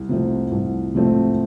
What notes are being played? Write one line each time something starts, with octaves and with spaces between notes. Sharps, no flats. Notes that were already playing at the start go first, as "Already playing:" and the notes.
Already playing: C2
C3 F3 A3 C4
C2
C3 F3 A3 C4